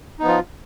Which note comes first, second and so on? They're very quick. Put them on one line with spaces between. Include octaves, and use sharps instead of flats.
D#4 B3 F3 F4